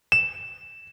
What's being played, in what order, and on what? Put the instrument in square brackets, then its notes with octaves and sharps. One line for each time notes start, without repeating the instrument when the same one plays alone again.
[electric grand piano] E7